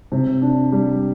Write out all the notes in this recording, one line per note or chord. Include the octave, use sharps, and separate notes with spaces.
C3
D4
G3